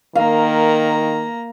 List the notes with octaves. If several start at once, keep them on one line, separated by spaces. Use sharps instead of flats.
D#3 A#3 F5 A#5